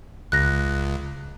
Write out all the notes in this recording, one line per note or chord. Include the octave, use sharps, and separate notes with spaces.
C#2 F#6 A#6